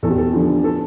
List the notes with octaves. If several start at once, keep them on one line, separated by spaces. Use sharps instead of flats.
E2 A4
G4
A4
D3 F3
A4